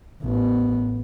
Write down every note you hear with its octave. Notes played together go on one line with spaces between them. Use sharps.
A1 B3